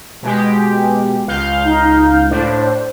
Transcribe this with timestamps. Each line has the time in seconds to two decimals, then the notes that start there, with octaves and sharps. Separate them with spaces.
0.23 B2 G#3 G4
1.27 C#2 F5 G6
1.65 D#4
2.31 A2 D4 C5